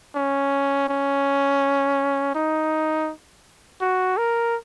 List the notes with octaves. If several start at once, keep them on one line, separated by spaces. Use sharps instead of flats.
C#4
C#4
D#4
F#4
A#4